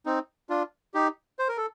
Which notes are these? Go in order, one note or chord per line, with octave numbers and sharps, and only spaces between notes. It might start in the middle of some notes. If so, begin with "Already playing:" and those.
C4 D#4
D4 F4
D#4 G4
C5
A#4
A4